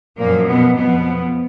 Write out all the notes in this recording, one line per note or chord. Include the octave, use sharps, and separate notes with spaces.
F#2 A#2 F3 A#3
B2 B3
F2 B2 F3 B3